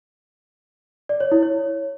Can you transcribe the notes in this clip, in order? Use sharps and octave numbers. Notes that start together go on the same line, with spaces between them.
D5
C#5
E4
C#5